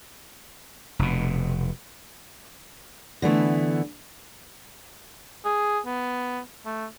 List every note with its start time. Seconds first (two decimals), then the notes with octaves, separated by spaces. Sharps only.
0.99 F1 B2
3.22 D3 E3 A3 B3
5.45 G#4
5.85 B3
6.65 A3